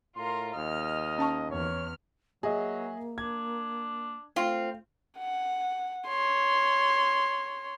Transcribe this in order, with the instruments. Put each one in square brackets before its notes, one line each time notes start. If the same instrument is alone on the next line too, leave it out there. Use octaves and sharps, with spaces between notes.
[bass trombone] A2 [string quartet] F4 A#4 [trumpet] C6
[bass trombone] D#2 [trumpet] D#5 [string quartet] F6
[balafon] C#4 A5 C#6
[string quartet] E2 F6 [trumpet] C#5
[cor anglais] F#3 [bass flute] A#3 [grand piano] G#4 D#5 E5
[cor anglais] D4 [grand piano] G#6
[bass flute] A3 [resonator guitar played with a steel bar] C4 F4
[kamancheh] F#5
C#5 C6